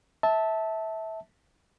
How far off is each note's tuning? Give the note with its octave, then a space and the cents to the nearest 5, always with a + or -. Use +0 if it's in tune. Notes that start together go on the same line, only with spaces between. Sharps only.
E5 -20 A5 +0